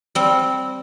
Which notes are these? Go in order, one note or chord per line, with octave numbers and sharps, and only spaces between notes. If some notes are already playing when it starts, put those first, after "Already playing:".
G3 C4